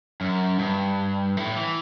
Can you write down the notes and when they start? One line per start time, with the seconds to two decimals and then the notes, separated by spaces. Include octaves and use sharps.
0.21 F#2
0.59 G2
1.37 A2
1.56 E3